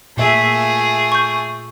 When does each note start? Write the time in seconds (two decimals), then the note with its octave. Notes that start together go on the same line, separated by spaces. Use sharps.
0.17 A#2 A3 G#4 E5
1.12 C#6 G6